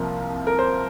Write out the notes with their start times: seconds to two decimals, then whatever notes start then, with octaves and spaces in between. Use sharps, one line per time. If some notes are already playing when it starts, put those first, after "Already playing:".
Already playing: C2 C3 F3 A#3
0.47 A#4
0.59 C5